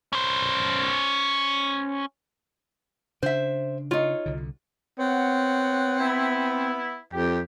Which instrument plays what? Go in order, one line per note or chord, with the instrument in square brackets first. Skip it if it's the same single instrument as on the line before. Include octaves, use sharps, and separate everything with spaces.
[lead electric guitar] C#4 C5
[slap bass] C#3 D4 [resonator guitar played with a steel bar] C5 E5
[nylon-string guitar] D#4 C#5 [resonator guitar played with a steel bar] F4
[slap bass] C2 D3
[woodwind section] B3 C#5 F#5 [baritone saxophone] C4
[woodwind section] B3 E4
[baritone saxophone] F2 [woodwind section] G4